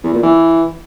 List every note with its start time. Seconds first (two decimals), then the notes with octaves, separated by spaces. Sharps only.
0.04 E2
0.13 A#2
0.23 E3